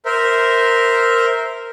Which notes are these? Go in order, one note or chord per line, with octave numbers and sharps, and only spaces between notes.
A#4 C5 E5